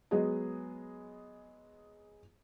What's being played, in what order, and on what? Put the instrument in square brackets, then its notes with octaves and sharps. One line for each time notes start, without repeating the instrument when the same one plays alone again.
[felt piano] F#3 G#3 B3 G#4 D#5